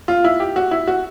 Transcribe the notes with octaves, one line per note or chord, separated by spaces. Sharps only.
F4
E4
G4
F#4
E4
F#4